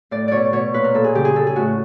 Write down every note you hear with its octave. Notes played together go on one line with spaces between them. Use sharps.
A2 D5
B2 C#5 D5
B2 C#5
A#2 B4
A#4
A#2 A4
G#4
C#3 G4
G#4
C#3 A4
G#4
A2 F#4